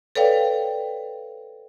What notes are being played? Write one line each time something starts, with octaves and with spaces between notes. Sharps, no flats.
A4 B4 C#5 D5 F5 G5